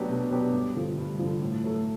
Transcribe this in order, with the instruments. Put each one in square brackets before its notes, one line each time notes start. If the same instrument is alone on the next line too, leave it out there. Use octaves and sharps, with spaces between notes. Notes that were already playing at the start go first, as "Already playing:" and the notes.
Already playing: [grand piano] F#3 B3 D4 G4
B2
F#3 B3 D4 G4
G2
D3 F3
G2
D3 F3
A2
F#3 A3